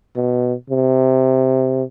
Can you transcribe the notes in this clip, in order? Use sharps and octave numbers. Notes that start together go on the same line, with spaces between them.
B2
C3